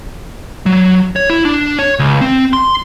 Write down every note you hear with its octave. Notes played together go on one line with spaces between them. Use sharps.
F#3
C#5
E4
D4
C#5
C#2
C4
C6